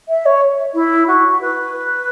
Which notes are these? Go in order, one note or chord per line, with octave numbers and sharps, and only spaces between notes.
E5
C#5
E4
F#4
B4